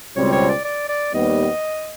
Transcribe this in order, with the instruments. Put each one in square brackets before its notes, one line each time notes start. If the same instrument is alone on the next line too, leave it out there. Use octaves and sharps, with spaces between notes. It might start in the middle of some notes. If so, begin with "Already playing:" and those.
[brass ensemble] C#2 B2 G3 C4 [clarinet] C#5
[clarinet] C#5
D5
D5
D5
[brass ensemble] D#2 D#3 G3 B3 [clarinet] D#5